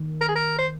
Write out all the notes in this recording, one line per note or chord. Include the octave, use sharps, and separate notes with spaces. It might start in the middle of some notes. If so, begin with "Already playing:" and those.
Already playing: D#3
A#4
G#4
A#4
C5